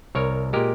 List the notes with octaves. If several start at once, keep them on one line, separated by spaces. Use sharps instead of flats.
C2 A#4 C#5
A#2 G#3 G4 A#4